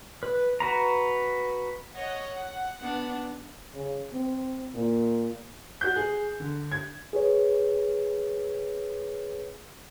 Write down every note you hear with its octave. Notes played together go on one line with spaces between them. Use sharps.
B4
F#4 B4 A#5
C#5 D#5 F#5
F#5
B3 D4
C#3
C4
A#2
F#4 G6
G#4
D3
G#6
G#4 B4 C#5